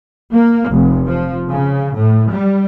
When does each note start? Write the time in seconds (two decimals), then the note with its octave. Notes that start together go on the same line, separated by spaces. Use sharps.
0.34 A#3
0.70 F1
1.08 F3
1.49 C#3
1.96 A2
2.31 G3